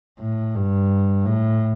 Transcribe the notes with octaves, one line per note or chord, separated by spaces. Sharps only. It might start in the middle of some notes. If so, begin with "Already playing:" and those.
A2
G2
A2